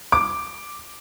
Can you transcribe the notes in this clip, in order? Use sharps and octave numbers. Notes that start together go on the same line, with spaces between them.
D6